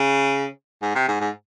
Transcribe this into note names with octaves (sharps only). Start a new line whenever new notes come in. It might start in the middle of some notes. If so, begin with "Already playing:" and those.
Already playing: C#3
G#2
C3
G#2
G#2